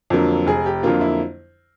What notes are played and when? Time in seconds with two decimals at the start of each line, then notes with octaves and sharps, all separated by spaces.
0.10 F2 D3 F#3 A#3
0.47 F1 G#4
0.66 G4
0.83 F2 D3 F#3 A#3 F4
1.01 E4